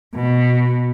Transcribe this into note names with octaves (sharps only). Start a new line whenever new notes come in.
B2